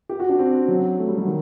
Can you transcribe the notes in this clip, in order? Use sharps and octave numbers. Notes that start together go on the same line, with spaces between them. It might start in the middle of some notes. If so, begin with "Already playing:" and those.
G4
F#4
D4
C4
F#3
A3
G3
F#3
D#3